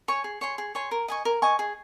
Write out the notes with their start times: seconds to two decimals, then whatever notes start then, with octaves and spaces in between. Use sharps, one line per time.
0.08 C#5 G#5 C#6
0.24 G#4
0.41 C#5 G#5 C6
0.58 G#4
0.75 C#5 G#5 C6
0.91 A#4
1.08 D#5 G#5 C#6
1.25 A#4
1.42 D#5 G#5 C#6
1.59 G#4